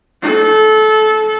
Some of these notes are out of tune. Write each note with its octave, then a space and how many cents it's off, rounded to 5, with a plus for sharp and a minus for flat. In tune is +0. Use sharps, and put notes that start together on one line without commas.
A4 -25